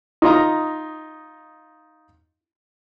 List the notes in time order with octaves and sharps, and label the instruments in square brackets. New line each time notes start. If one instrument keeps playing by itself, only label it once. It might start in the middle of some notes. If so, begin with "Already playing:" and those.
[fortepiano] D#4 F4 D#5 A#5